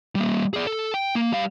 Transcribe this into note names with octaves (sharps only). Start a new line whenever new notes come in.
G3 A#3
G#4 D5
A4
G5
A#3
G3 F5